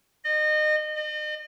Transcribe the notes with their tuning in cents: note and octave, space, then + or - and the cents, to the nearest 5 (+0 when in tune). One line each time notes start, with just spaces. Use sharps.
D#5 -30
D#5 -40